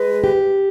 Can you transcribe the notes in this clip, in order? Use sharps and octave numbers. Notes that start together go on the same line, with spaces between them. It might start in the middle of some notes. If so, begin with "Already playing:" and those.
Already playing: G#3 B4
G4